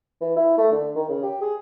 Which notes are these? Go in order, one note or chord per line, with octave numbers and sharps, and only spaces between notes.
E3
E4
A3
D3
D#3
C#3
G4
G#4